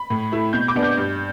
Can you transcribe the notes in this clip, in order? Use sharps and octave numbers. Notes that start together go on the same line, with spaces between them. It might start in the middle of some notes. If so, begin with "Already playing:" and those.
Already playing: B5
A2
A3 E4
B2 G6
D6
B3 D4
G6
G2